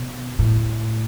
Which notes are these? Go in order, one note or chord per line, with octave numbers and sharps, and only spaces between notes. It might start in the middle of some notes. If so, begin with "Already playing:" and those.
Already playing: B2
A2